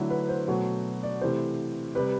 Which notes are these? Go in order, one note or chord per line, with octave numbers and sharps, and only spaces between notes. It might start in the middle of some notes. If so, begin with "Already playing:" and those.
Already playing: D3 F#3 A3 D4 E4
B4
C5
B2 F#3 A3
D5
C3 E3 A3 C5
C3 G3 B4